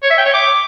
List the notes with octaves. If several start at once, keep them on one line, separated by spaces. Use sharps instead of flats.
C#5
E5
G5
C#5
D6